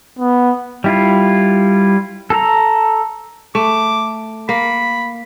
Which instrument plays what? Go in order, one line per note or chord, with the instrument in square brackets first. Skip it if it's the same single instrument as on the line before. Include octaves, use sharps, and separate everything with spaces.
[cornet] B3
[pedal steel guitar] G3 E4 F4
A4 A#5
[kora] A3 [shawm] D6
[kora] A#3 [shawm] B5